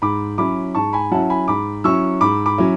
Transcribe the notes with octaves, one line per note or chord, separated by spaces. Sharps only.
G#2 B5 D6
F#3 C#4 E4 B5 D6
G#2 A5 C#6
G#5 B5
F#3 C#4 E4 F#5 A5
G#5 B5
G#2 B5 D6
F#3 C#4 E4 C#6 E6
G#2 B5 D6
B5 D6
F#3 C#4 E4